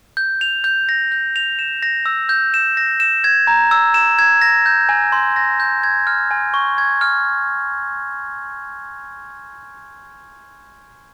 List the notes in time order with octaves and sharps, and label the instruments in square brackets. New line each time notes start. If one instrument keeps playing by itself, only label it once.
[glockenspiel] G6
F7
G6
A#6
G6
F7
E7
A#6
E6
G6
E7
A#6
E7
G#6
A#5
E6
E7
G#6
A#6
G6
G#5
C6
A#6
G6
G#6
F6
G#5
C#6
G#6
F6